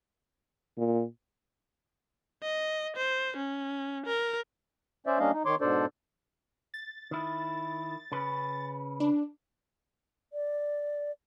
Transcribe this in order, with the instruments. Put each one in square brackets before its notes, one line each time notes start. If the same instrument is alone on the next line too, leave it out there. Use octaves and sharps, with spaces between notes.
[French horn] A#2
[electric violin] D#5
C5
C#4
A#4
[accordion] C#4 C5 D5 E5
G3 A#3 C#4 D4 D#5 F5
D#4
D#3 C#5 C6 D6
G#2 B2 D4 A4 C5 D5
[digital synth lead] A6
[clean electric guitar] D#3 E4
C#3 C#4 B4
[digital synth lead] D4
[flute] D5